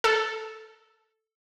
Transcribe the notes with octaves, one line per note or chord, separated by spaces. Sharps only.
A4